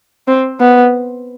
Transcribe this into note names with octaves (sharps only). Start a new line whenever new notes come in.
C4
B3